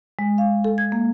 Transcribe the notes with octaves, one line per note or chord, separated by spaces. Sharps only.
G#3
F5
A4
G#6
A#3